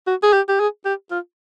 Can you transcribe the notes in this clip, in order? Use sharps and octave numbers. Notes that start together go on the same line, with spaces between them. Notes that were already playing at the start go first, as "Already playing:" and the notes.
F#4
G#4
G4
G4
G#4
G4
F4